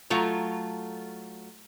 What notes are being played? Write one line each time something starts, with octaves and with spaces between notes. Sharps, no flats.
F#3 A3 F4 A#5